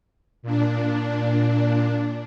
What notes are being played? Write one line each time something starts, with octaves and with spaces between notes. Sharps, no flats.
A#2 D4